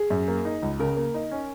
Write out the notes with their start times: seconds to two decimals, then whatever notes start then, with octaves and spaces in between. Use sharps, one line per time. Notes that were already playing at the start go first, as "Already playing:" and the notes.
Already playing: G#4
0.10 F#2
0.28 A#3
0.45 D#4
0.62 C#2
0.79 C#3 A#4
0.97 A#3
1.14 D#4
1.32 C#4